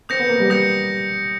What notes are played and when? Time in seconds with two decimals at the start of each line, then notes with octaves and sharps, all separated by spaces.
0.09 C4 D#6 G6 A#6 C#7
0.19 B3
0.29 A#3
0.40 G3
0.50 G3 D#6 G6 A#6 C#7